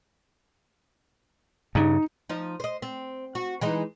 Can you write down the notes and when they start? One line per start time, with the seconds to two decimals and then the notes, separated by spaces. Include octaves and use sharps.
1.75 G2 C#3 D#4
2.29 F3 D#4
2.60 C5 D#5
2.82 C4
3.35 F#4
3.61 E3 G#3 D#4